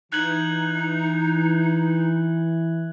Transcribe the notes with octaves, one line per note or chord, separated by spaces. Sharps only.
E3 D#4 F#6 G#6 F#7